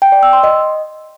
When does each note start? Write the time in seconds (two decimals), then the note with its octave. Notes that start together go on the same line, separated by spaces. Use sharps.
0.02 G5
0.12 D5
0.23 E6
0.33 C6
0.43 D#5